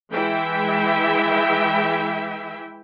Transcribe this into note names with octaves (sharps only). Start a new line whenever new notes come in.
E3 G#3 E4 E5 G5